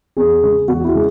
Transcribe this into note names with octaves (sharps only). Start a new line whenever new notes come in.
E2 G#4
C#3 G#3
E2 F#4
E4
C#3 G#3